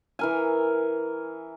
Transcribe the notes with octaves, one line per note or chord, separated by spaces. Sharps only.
E3 A#4 G#5